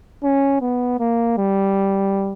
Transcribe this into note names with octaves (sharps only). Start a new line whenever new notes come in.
C#4
B3
A#3
G3